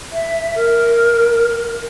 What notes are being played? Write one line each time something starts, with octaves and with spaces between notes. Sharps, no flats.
E5
A#4